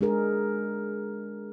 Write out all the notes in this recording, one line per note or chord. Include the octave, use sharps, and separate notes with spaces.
G#3 D4 G#4 A#4